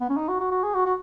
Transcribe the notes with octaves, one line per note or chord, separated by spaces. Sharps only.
B3
C#4
D#4
F#4
F#4
F#4
G#4
F#4
F#4